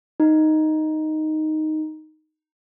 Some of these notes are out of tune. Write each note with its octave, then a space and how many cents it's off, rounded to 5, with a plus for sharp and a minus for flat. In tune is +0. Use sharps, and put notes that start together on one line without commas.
D#4 +0